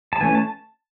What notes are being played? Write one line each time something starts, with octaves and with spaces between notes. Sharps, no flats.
A5
E3 A3 C#4 G#5
A5